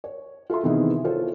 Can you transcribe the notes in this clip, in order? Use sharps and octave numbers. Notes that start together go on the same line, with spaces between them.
C#5
F4 A4 E5 C6
C3 D#3 E3 B3 E4 G#4
F4 A4 C5 C#5